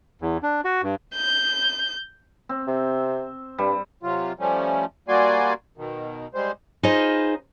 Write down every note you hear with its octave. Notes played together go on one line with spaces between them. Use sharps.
E2
D4
F#4
G2
G6
C4
C3
G2 G3
C3 F#3 F4
F3 G3 A3 C#4
G3 A#3 F#4 D5 G#5 C6
B2 D#3
G3 G#3 C5
D#4 F4 G#4 B4 C5 D#5